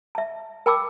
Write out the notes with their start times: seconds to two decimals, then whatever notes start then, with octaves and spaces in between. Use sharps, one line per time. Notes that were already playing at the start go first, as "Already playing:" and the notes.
0.15 E5 A5
0.66 A#4 G5 A5 B5 D6 E6